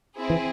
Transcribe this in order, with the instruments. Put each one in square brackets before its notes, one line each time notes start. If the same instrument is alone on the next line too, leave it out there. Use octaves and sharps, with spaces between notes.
[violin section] C4 E4 G#4
[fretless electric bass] E3